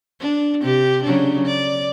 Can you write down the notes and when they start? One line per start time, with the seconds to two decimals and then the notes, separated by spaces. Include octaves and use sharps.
0.20 D4
0.61 C3 G4
1.03 C#3 F#3 D4
1.46 D5